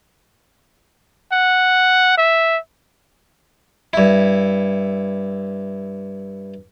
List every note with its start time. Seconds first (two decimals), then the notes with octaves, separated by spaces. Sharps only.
1.33 F#5
2.18 E5
3.93 G2 E4